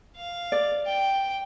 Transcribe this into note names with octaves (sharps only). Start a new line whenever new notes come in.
F5
D5
G5